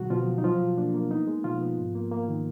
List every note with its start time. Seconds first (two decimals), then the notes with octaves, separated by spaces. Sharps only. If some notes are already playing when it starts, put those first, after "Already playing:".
Already playing: B2 D3 F#3 G#3 F#4
0.10 B2 F3 F4
0.27 B3
0.38 D#4
0.44 F3 F#3 F4
0.61 B2
0.77 A#3 D4
0.94 A#3
1.11 B3 D#4
1.28 G#3
1.44 B2 F3 F4
1.62 B3
1.78 G#2
1.95 A#3
2.11 A#3
2.28 D#3